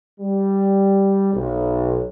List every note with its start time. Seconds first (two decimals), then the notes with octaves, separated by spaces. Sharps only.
0.20 G3
1.34 B1